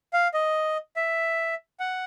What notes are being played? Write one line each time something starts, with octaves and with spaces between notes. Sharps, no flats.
F5
D#5
E5
F#5